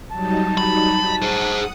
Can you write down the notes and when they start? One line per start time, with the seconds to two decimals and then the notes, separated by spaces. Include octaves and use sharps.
0.12 F#3 G3 D#4 A5
0.58 B5
1.22 G#4 C5 F#5 D#6